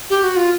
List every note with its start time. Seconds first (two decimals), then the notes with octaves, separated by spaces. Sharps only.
0.10 G4
0.23 F#4
0.36 F4